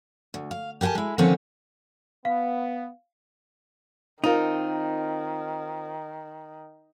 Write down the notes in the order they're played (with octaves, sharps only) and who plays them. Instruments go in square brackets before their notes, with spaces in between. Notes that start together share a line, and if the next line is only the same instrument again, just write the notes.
[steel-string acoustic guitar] D2
F5
G4 A#4 F#5 G#5 A5
G#3 E4
D3 D#3 F3 A#3 C4 C#4
[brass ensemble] B3 [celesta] F5
[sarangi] D#3 [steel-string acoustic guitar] C4 F4 A#4 [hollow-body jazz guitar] D#4